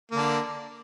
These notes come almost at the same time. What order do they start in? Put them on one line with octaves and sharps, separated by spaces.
A#3 D3 D4